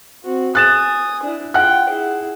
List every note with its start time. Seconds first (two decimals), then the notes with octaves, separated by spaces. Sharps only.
0.23 C4 F#4
0.55 G#5 D#6 F#6 A6 E7
1.23 D4 E4
1.54 F4 F#5 G5 F#6
1.89 E4 G#4